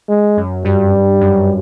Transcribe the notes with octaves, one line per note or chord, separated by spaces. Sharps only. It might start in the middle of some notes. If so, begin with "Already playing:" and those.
G#3
F#2
G2 G3
F#2